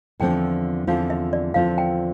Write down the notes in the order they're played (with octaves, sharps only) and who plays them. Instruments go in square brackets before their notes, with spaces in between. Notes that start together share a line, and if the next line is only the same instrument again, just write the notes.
[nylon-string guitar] E2 D3 F3 C4 F4 [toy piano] G5
[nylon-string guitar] E2 D3 F3 C4 F4 [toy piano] F5
[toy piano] E5
D5
[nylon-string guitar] E2 D3 F3 C4 F4 [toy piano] F5
[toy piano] G5